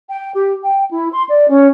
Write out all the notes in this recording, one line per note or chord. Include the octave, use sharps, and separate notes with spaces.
G5
G4
G5
E4
C6
D5
C#4